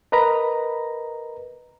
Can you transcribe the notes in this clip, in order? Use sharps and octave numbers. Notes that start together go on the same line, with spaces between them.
A#4 B4 D#5 A#5 B5